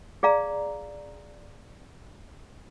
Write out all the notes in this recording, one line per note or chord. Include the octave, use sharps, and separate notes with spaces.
G#4 D5 F5 A#5